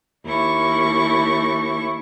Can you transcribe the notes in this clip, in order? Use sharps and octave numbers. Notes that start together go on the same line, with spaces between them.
D#2 E4 C#6